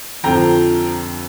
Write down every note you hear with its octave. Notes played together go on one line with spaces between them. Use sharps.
F2 D3 F3 G5 A#5